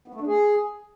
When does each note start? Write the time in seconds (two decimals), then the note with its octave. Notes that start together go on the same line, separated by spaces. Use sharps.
0.08 B3
0.14 A3
0.21 D4
0.27 G#4